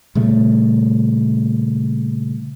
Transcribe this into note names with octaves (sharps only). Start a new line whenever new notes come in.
A#2 C#3 G3 A3